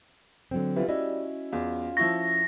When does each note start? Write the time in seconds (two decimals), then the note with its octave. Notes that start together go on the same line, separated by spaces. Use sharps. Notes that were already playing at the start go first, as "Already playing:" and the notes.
0.51 D3 F#3 C4
0.76 E3 G3 F4
0.89 G3 C#4 E4 F#4 D#5
1.53 E2 F4
1.97 F3 E4 C#6 A#6